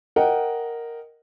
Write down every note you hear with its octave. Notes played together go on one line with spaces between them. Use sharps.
A#4 D#5 F#5 G5